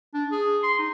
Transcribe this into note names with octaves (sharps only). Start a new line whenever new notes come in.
D4
G#4
C6
D#4